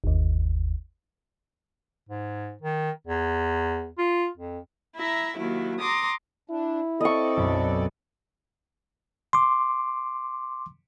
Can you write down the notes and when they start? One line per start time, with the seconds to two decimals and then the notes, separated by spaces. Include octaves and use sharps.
0.04 G1 D#2
2.09 G#2
2.62 D#3
3.07 E2
3.98 F4
4.37 F2
4.97 E4 E5 A#5
5.36 D#2 F#3 E4
5.80 A#5 C6 D6 D#6
6.50 D4 E4
7.00 C4 A4 D5 D#5 C#6
7.37 B1 F#2 B5
9.33 C6 D6